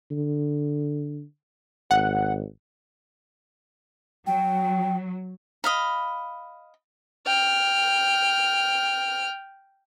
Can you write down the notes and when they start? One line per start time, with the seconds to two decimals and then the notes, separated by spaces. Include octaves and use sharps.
0.11 D3
1.91 G#1 F#5
4.27 F#3 G5
5.64 D#5 F5 B5
7.26 G5 F6